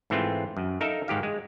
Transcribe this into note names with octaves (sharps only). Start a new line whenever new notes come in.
G#2 E3 A3 C4 F4
F#2
D#4 A4 A#4 E5 F5
G#2 D#3 G4 F5
G#3